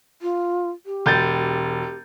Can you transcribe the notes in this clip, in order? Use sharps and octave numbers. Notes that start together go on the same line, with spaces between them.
F4
G4
E1 G6 A6